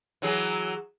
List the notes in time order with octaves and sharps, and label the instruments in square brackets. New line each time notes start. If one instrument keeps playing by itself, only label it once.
[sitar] E3 F#3 G#4